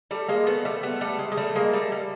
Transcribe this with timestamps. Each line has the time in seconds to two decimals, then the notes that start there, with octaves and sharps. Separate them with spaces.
0.11 G3 A3
0.29 G#3 A#3
0.46 A3 B3
0.65 G3 A3
0.83 A3 B3
1.01 G3 A3
1.19 G#3
1.32 G#3
1.37 G3 A3
1.56 G#3 A#3
1.73 G3 A3
1.92 G3